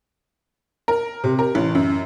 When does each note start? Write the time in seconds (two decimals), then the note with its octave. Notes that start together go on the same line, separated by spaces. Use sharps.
0.88 A#4
1.24 C3
1.39 A#4
1.55 A1
1.75 F#2